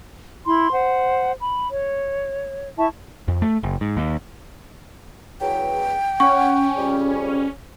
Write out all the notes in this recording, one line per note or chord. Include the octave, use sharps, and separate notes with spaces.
E4 B5 C6
C5 F#5
B5
C#5
E4 E5 A5 C#6
F2
A3
F#1
G#2
D#2
E2 C#3 F#3 G5
C#4 C#5 F#5 C#6
F2 C#3 G3